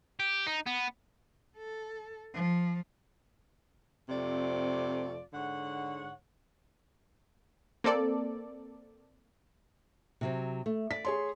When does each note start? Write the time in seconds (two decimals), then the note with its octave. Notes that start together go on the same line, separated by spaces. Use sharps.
0.20 G4
0.47 D#4
0.67 B3
1.58 A4
2.34 F3
4.09 F2 C3 A3 C4 F4 D5
5.33 G#2 D3 C#5 F#5
7.84 A#3 C4 A4 D5
10.21 C3 F#3 C4
10.66 A3
10.91 D5 B6
11.05 G#4 C#5 C6